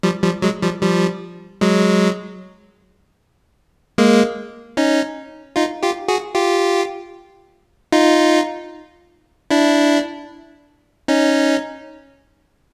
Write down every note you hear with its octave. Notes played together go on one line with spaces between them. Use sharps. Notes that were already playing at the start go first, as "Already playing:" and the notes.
F3 G3
F3 G3
F#3 G#3
F3 G3
F3 G3
F#3 G#3
G#3 A#3
C#4 D#4
D#4 F4
F4 G4
F#4 G#4
F4 G4
D#4 F4
D4 E4
C#4 D#4